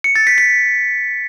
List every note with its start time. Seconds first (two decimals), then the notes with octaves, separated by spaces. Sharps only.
0.04 C#7
0.16 A6
0.27 B6
0.38 B6